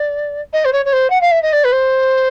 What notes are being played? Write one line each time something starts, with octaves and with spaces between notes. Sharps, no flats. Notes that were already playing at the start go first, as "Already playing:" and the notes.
Already playing: D5
D#5
C5
C#5
C#5
C5
F#5
F5
E5
D#5
D5
B4
C5